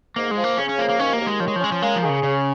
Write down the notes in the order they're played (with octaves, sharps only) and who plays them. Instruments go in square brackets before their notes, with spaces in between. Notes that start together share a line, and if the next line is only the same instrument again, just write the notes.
[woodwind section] G#2 [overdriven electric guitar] A#3
[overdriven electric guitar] G#3
[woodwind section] F3
[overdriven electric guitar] A#3
[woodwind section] C#3 [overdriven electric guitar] C#4
[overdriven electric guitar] C#4
[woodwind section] F3 [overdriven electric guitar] A#3
[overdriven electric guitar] A#3
[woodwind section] D#2 [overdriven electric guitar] C#4
[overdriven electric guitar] A#3
[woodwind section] D#2
[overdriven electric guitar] G#3
[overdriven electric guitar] F3 [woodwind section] C#5
[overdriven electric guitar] G#3
F3
[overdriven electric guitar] G#3 [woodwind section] C#4
[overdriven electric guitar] F3
[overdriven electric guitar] G#3 [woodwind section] A#3
[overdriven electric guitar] F3
[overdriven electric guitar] D#3 [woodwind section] G#4
[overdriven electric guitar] C#3
[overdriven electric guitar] C#3 [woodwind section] C#4